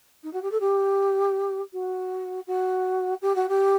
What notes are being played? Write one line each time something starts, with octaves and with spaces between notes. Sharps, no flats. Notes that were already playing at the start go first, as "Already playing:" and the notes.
D#4
F#4
G4
A4
G4
F#4
F#4
G4
F#4
G4